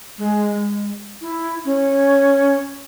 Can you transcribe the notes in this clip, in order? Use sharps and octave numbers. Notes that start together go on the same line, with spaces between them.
G#3
E4
C#4